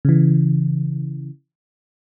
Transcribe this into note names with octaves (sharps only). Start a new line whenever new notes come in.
C#3 E3